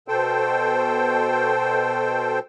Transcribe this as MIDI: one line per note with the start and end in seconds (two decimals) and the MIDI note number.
0.08 2.39 47
0.08 2.39 69
0.08 2.39 72
0.08 2.39 79